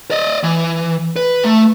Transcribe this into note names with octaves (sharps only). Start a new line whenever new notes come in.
D5 D#5
E3
B4
A3